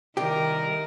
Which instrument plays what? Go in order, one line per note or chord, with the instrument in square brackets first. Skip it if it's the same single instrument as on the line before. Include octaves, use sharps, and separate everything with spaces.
[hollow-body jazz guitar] C2 G4 [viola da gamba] D#3 A#4